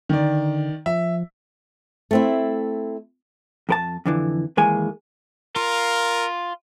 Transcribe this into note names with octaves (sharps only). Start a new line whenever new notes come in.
D3 D#3 D5
F3 E5
A3 C4 E4
F2 A#4 A5
F2 D3 E3
D#2 E3 G#3 A#3 G#5
F4 A#4